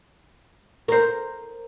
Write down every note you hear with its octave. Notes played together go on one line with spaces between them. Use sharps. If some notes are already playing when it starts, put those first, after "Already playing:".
A#4 C5